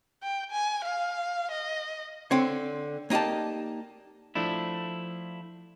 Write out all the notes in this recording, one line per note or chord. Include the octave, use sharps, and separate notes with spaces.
G5
G#5
F5
D#5
D3 C4 C#5
A#3 D#4 G4 D5 A5
F3 A3 D4 E4